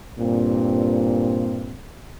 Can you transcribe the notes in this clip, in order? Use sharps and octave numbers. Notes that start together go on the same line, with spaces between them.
G2 A#2 C4